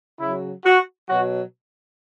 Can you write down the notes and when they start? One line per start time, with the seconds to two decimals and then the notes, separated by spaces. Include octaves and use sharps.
0.20 C#3 F#3 E4
0.65 F#4
1.09 B2 F#3 F#4